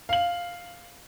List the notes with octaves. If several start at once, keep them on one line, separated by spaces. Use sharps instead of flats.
F5 F#7